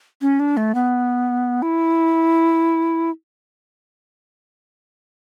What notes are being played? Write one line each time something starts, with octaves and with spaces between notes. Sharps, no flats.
C#4
D4
A3
B3
E4